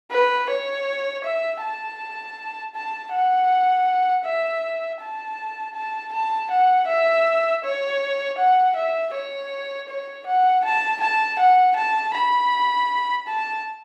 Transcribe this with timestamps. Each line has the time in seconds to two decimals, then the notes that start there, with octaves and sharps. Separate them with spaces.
0.11 B4
0.50 C#5
1.24 E5
1.62 A5
2.75 A5
3.13 F#5
4.25 E5
5.01 A5
5.75 A5
6.13 A5
6.51 F#5
6.87 E5
7.64 C#5
8.38 F#5
8.76 E5
9.14 C#5
9.88 C#5
10.26 F#5
10.64 A5
11.01 A5
11.39 F#5
11.76 A5
12.14 B5
13.27 A5